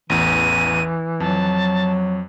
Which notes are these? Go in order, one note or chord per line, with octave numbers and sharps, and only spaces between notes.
A1 E2 E3 D#7
F2 F#3 A5